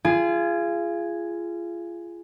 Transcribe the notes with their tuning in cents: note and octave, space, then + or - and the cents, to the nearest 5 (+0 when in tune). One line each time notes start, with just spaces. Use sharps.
F4 -30 G#4 +0